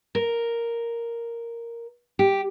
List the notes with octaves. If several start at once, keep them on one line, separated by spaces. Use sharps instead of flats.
A#4
G4